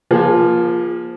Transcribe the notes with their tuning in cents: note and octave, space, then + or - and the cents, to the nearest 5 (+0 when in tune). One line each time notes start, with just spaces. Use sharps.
F3 +0 A#3 +30 G#4 -25